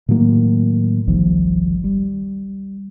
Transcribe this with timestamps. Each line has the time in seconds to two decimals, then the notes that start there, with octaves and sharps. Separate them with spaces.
0.08 A2 D#3 F#3 A#3
1.07 G1 C2 D#3 F3
1.84 G3